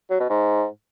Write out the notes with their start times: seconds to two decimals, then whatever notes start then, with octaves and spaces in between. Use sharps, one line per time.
0.10 F#3
0.20 B2
0.30 G#2